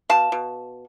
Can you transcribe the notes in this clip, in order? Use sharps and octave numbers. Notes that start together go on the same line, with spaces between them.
B2 F5 A5
B2